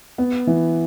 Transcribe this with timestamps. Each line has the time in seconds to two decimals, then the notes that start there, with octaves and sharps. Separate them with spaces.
0.18 B3
0.47 E3